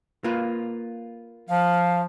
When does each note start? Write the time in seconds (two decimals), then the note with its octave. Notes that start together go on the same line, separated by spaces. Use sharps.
0.24 A#3 F4 B4
1.49 F3 F5